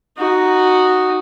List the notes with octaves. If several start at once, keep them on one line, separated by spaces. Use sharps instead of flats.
D#4 F#4